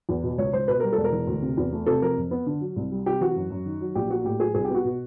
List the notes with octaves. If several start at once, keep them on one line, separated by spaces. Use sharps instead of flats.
E2
B2
C#2 C#5
C#2 C5
B2 B4
G3 A#4
E1 A4
A#4
E3
D2
C3
E2
A3
C3 A4
F3 A#4
F2
B3
D3
F#3
C2
G3
C3 G4
E3 F#4
F#2
F#2
D#3
F#3
A#1 G4
A#3 F#4
A2 G4
F#3 G#4
C2 G#4
G4
B3 F#4
B2